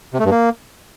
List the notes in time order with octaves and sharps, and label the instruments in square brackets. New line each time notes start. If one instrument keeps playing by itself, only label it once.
[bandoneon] C3
A3
G2
A#3